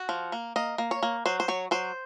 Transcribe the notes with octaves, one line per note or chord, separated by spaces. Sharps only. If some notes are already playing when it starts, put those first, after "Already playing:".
Already playing: F#4
F3
A#3
A#3 D#5
A#3
C#5
A#3
F#3 C5
C5
F#3 C#5
F#3 C5